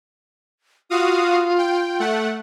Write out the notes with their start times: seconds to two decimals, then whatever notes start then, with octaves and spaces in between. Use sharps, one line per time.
0.90 F4 F#4 F5 D#6
1.58 G5
2.00 A3 F#5